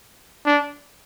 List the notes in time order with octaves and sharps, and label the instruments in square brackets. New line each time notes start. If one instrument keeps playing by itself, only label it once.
[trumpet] D4